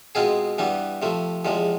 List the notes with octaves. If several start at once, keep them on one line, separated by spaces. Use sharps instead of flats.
B2 G#3 C4 F4 G#4
G2 E3 G3 B3
C3 F3 A3
E2 C3 F3 G#3